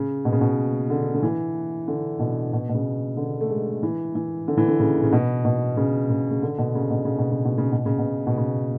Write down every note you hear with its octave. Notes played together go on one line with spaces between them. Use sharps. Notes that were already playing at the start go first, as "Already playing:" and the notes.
Already playing: C#3
B2
C#3
B2
D3
D3
E3
D3
B2
B2
B2
C#3
D3
A3
G#3
E3
E3
D3
E3
D3
C#3
C#3
B2
B2
C#3
C#3
C#3
D3
B2
C#3
B2
C#3
B2
C#3
B2
C#3
B2
C#3
B2
B2
C#3